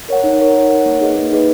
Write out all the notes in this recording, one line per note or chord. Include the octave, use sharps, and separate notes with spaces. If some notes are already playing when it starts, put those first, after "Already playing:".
A#4 C#5 F#5
D#4
A#4 C#5 F#5
D#4
A#4 C#5 F#5
A#3
D#4 G#4 B4 D#5
A#3
D#4 G#4 B4 D#5